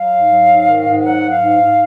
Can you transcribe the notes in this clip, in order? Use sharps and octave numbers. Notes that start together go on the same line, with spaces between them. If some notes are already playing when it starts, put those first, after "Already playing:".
Already playing: F#3 F5
G#2
F#3
G#2
D#3
G#2
F#3 F#5
F#3
F5
G#2
G#2